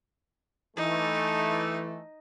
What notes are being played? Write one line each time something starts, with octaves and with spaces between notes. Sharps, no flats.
E3 A3 D#4